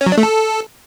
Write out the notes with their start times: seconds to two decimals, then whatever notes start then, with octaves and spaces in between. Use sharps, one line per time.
0.01 C#4
0.06 F#3
0.12 D4
0.18 A3
0.23 A4